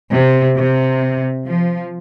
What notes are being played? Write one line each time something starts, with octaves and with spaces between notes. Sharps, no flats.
C3
C3
F3